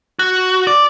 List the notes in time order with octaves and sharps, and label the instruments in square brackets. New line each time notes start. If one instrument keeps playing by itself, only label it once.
[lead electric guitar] F#4
D5